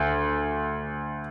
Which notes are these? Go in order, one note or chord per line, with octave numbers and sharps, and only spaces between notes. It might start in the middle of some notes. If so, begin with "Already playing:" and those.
Already playing: D2